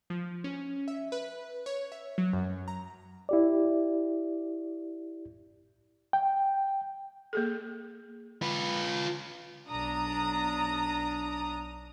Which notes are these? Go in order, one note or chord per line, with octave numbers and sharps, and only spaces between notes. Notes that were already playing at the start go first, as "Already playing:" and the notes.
F3
C#4
E5
B4
C#5
E5
F#3
F#2
A#5
E4 G4 D5
G5
A#3 G#4 A4
F4 B4
B1 D4 A#5 D#6